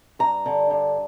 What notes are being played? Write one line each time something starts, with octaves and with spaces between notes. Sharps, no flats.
G2 A#5
D3
G2